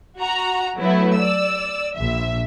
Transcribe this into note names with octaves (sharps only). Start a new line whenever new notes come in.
F#4 A#5
F#3 A3 B3 E4
D5 E6
A#1 E5